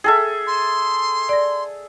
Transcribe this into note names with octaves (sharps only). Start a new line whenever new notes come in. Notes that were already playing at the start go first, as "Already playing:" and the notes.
G#4 A4 E5 G5 A5 F6
C6
D5 A#6